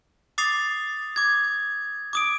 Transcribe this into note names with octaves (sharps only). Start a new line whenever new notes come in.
D6 D#6 A6 C7 F7
D6 G#6
D6 D#6 D7